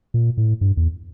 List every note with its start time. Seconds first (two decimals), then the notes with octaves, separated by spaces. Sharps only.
0.14 A#2
0.37 A2
0.61 G2
0.77 E2